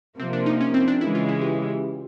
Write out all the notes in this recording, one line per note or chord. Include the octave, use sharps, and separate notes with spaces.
C3 F3 A#3 C4
D4
D#4
C#4
C4
D4
C#3 E3 G#3 E4
F4
E4
G4